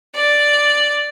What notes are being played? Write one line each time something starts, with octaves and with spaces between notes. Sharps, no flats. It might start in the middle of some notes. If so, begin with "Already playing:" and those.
D5